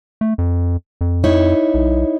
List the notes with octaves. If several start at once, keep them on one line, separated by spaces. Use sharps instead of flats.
A3
F2
F2
D#4 E4 C#5
B1